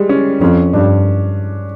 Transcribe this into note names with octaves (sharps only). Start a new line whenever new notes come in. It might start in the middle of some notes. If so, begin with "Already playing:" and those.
Already playing: G3 G#3
C#4
F2 C#4
G2 D4